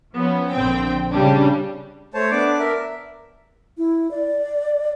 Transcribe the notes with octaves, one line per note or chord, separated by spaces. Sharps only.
F3 B3 C#4
A#1 D3 C4 G5
C#3 G3 D4
A3 C5 C#5 A5
B3 D4 D5 D6
A#4 E5
E4
D5